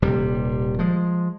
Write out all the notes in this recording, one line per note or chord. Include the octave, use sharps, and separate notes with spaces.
D#1 C3 G3
F3 G#3